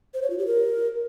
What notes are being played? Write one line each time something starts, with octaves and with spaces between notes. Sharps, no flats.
C5
C#5
F4
G4
A#4